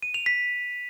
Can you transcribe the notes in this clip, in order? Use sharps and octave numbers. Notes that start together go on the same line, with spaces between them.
D#7
F7
B6